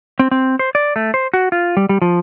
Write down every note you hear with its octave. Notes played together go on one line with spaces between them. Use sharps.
C4
C4
C5
D5
A3
C5
F#4
F4
G3
G3
F3